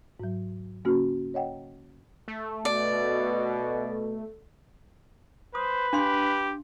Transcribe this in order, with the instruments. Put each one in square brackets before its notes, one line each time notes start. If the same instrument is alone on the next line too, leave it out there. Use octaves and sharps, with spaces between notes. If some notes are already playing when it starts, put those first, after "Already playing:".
[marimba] G#2 F#3
C#3 A#3 C#4 F#4 F6
C#5 D#5 F#5 G5 A#5
[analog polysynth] A3
[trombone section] B2 [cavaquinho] D5
[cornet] B4 [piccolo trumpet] C5 [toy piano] D#6
[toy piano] D4 F5 C6 [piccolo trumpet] G4